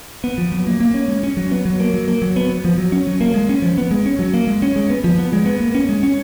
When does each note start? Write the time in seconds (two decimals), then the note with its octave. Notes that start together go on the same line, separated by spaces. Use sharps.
0.24 B3
0.38 F3
0.52 F#3
0.67 A#3
0.80 A#3
0.94 C#4
1.08 G#3
1.23 C#4
1.37 F#3
1.51 B3
1.65 F#3
1.80 A#3
1.94 F#3
2.08 A#3
2.22 F#3
2.36 B3
2.50 B3
2.65 F3
2.78 F#3
2.92 C#4
3.07 F#3
3.21 A#3
3.34 G#3
3.49 C#4
3.62 F3
3.78 B3
3.91 G#3
4.06 C#4
4.19 F#3
4.34 A#3
4.47 G#3
4.62 C#4
4.76 G#3
4.90 B3
5.04 F3
5.18 B3
5.33 G#3
5.46 B3
5.60 A#3
5.75 C#4
5.89 G#3
6.03 C#4